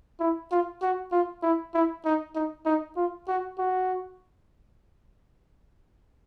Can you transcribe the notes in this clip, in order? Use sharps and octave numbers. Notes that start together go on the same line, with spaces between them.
E4
F4
F#4
F4
E4
E4
D#4
D#4
D#4
F4
F#4
F#4